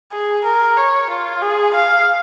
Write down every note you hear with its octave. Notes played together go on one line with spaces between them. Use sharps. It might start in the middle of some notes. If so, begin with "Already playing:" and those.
G#4
A#4
C#5
F4
G#4
F5